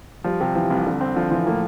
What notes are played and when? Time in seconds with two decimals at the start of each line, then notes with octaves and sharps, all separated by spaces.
0.24 F3 G3
0.41 C3
0.55 E3 F3
0.70 C2
0.86 C2 D3
1.01 C4
1.16 D3 F3
1.31 E3 F3
1.46 A2 A#3